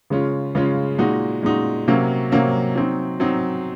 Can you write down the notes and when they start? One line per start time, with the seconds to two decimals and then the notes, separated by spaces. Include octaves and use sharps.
0.10 C#3 G#3 C#4 F4
0.55 C#3 G#3 C#4 F4
0.99 A#2 G#3 D#4 F#4
1.43 A#2 G#3 D#4 F#4
1.88 C3 F#3 A#3 C#4
2.32 C3 F#3 A#3 C#4
2.76 F#3 C4 D#4
3.20 F#3 C4 D#4